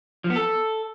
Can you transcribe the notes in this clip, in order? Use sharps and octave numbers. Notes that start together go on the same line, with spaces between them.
F3
B3
A4